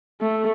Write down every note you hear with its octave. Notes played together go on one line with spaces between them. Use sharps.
A3